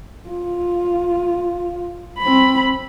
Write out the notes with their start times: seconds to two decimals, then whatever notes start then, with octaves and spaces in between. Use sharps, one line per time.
0.29 F4
2.19 C4 B5